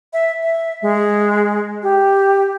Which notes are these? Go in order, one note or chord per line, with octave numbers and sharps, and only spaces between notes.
E5
E5
G#3
G4